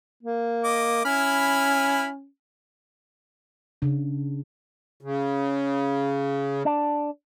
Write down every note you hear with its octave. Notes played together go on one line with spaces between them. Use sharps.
A#3
D#5 D6
C#4 E4 B5 F6
C#3 D4
C#3
D4